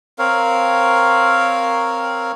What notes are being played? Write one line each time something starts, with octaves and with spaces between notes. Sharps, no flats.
C4 A#4 C#5 F5